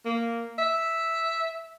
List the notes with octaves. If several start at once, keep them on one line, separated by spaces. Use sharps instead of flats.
A#3
E5